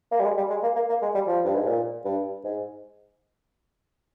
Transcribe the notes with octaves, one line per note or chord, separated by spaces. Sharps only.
A#3
G3
G#3
G3
G#3
A#3
A#3
A#3
G#3
G3
F3
G2
G#2
A#2
G2
G#2